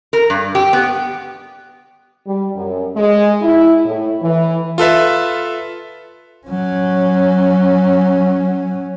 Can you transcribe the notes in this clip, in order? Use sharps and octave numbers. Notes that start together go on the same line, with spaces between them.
A#4
G2
G4
B3
G3
F#2
G#3
E4
A2
E3
F4 A4 B4 E5
F#3 C#4